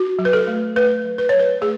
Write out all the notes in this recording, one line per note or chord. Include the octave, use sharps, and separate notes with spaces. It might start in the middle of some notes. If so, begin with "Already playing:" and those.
Already playing: F#4
F#3
B4
A4
A3
A3 B4
F#3
B4
F#3 C#5
B4
A3 G#4